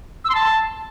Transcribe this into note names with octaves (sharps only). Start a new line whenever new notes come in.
E6
C6
A5